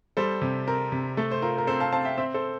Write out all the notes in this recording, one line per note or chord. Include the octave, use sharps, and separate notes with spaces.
G3 A4 C5
C3
C4 A#4
C3
A3 A4
C5
F4 A#4
A#4
C4 A4 C5
F5 A5
C4 F5 A5
E5 G5
C4 C5 E5
A4 C5